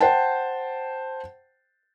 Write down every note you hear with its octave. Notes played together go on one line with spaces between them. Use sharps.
C5 F#5 G5 A5